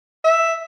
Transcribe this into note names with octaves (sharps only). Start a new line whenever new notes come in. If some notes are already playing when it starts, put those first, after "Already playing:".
E5